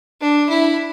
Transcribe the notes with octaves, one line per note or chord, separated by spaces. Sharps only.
D4
E4